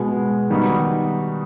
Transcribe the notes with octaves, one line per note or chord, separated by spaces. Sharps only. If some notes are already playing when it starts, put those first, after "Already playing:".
Already playing: B2 G#3 B3
D#3 G3 B3 D#4 F#4